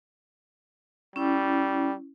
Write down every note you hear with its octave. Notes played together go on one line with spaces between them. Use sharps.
G3 C#4 E4